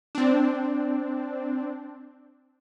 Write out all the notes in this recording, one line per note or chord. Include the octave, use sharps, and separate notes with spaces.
C4 D4